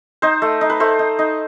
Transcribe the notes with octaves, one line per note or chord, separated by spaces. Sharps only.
D#4 C5
A3
D#4
B4
A3 C5
D#4
D#4